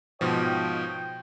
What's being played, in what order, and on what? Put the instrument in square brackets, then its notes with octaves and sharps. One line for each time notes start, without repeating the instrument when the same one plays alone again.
[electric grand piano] G#2 B2 F3 [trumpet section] C#5 D#5 G5